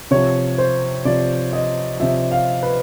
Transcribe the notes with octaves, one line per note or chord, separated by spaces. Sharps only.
C3 F3 C#5
C5
C3 F3 D5
D#5
C3 F3 E5
F5
B4